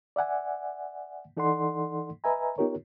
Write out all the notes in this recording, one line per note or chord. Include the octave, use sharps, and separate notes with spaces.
D5 E5 F#5 G#5
E3 D#4 A4 D5 F#5 C6
B4 D#5 E5 G#5 A#5
B3 D#4 F4 G4 A#4 C#5